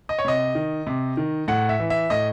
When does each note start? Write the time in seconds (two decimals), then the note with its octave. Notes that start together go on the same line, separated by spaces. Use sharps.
0.09 D#5
0.19 C#5
0.25 C3 D#5
0.55 D#3
0.87 C3
1.17 D#3
1.48 A2 F#5
1.69 E5
1.80 E3
1.90 E5
2.10 A2 D#5